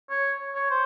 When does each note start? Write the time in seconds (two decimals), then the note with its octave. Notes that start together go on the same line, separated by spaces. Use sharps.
0.10 C#5
0.55 C#5
0.70 C5